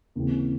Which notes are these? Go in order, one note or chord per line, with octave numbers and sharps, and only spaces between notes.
D#2 C#3 E3 C4